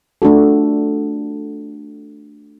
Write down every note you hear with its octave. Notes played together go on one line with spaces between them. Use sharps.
A3 D4 F4 F#4 A4